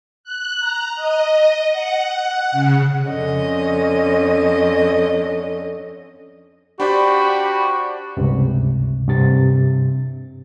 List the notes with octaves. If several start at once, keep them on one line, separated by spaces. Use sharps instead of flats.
F#6
A#5
D#5
F#5
C#3
F2 D3 C#4 D#5
D4 F#4 G4 C5 D5 B5
C#2 G2 C3
G2 C3 A6